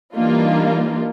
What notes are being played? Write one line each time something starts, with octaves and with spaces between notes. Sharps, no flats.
E3 G3 A#3 D4 D#4 F4